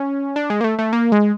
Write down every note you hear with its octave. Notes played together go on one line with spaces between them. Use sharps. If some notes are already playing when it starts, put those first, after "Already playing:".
Already playing: C#4
D4
G#3
A#3
A3
A3
A#3
G#3